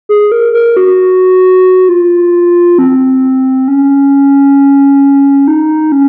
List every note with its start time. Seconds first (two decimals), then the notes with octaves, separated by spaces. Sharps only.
0.09 G#4
0.32 A#4
0.53 A#4
0.77 F#4
1.89 F4
2.78 C4
3.68 C#4
5.48 D#4
5.92 C#4